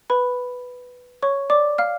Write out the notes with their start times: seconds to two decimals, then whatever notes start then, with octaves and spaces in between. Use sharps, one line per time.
0.10 B4 B5
1.22 C#5 C#6
1.50 D5 D6
1.78 F5 F6